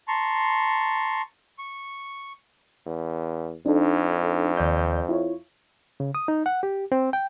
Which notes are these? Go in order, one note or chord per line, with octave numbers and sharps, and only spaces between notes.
A5 A#5 C6 C#6
C#6
E2
F2 D4 D#4 A4
D#2 D5 G6
E4 F4 C#5
C#3
D#6
D#4
F#5
G4
C4
G5